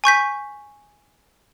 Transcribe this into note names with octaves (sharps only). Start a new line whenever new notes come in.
G#5 C#6 G6 B6